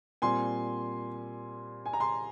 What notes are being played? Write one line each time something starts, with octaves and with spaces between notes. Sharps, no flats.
A#2 G3 C4 G#5 C6
G#5
A#5
G#5 C6